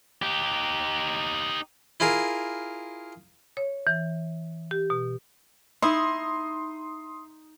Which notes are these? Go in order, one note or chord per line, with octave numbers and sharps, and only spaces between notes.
D#4 G4
E4 F4 G#4 A#4
C#5
E3
G4
B2
D#4 E4 C6 D#6